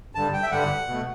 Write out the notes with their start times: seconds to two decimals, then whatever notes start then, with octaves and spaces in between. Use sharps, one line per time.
0.15 G2 D3 G3 A5
0.33 G5
0.43 E5
0.51 G2 D3 G3 F#5
0.87 B2 A3